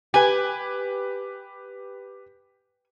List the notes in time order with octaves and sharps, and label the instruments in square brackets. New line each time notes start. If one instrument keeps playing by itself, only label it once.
[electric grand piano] G4 B4 [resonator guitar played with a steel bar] G#5